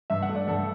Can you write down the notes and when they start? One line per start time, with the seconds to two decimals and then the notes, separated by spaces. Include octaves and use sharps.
0.10 G2 E5
0.22 F#5
0.29 A3
0.35 D5
0.48 G2 A4